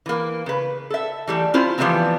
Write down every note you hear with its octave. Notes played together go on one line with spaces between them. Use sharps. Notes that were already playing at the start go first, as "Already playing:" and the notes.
E3 A#3
C#3 B4
A4 E5
E3 G3 A3
C#4 E4 F4 C5
E3 F3 G3 A3 B3 C4